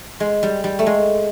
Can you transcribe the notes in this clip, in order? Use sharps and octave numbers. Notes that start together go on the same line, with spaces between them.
G#3
G3
G3
A3
G#3